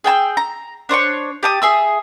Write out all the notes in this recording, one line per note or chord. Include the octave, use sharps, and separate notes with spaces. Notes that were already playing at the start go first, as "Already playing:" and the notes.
G#4 G5 G#5 E6
A#5
D4 C5 C#5 C#6
G4 A5 D#6
G#4 E5 E6